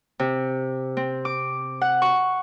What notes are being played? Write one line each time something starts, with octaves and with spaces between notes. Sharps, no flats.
C3
C4
D6
F#5
C#6